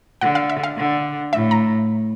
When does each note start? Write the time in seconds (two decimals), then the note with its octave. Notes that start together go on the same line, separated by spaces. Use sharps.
0.21 D3 F#5
0.35 F5
0.50 E5
0.63 F5
0.77 D3
1.33 A2 E5
1.51 A#5